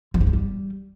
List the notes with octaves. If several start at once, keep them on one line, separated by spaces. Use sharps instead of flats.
F3
G3
G#3
G3